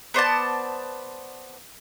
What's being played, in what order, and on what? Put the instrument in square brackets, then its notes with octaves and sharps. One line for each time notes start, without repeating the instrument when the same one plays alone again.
[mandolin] B3 C5 D5 A5